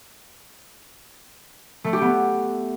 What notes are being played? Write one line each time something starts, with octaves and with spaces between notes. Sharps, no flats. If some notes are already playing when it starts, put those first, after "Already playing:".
A3
G4
B3